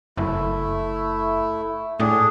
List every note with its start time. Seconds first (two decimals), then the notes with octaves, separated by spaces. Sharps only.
0.17 F#1 A3 E4
2.00 A2 D4 G#4